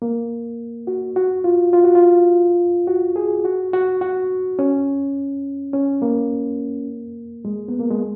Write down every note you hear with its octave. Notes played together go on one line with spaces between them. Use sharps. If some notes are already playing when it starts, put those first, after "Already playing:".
A#3
F#4
F#4
F4
F4
F#4
F4
F#4
G#4
F#4
F#4
F#4
C#4
C#4
A#3
G#3
B3
A#3
G#3